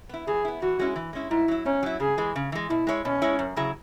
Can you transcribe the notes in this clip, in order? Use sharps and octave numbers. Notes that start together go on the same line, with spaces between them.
B3 E4
E3 G#4
B3 E4
E3 F#4
G#3 C#4 E4
E3
G#3 C#4 E4
G#2 E4
F#3 E4
G#2 C#4
F#3 E4
C#3 G#4
E3 G#3
C#3
E3 G#3
B2 E4
G#3 E4 C#5
B2 C#4
G#3 E4 C#5
F#2
C#3 F#3 E4 G#4